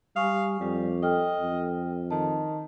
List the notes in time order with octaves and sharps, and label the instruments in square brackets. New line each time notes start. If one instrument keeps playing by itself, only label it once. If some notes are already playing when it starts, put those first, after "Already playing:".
[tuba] G3 [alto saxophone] F5 [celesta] G#5 C#6 D#6
[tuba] F2 [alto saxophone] G3
[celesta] A4 G5 F6 [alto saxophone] D#5
[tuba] F2
[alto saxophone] D#3 [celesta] A5